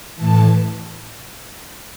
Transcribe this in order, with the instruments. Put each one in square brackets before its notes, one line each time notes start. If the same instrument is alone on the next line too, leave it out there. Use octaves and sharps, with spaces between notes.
[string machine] A2 E3 A5